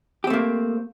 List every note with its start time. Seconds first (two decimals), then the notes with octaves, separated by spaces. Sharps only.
0.24 G4
0.27 C4
0.30 A3
0.33 A#3